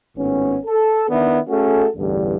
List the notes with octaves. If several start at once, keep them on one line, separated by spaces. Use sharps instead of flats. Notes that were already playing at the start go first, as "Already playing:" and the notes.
G#1 A2 B3 C#4
A4
D#3 B3 D4 E4
A3 C#4 F#4 G#4 A4
A1 E2 G2 D3 G3